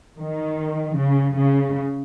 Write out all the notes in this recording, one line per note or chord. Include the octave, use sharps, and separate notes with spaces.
D#3
C#3
C#3